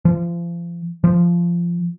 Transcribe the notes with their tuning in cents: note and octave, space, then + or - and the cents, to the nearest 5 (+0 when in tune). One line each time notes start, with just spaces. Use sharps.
F3 -35
F3 -15